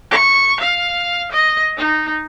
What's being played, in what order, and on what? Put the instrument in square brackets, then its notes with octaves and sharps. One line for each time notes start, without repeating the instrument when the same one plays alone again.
[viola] C#6
F5
D#5
D#4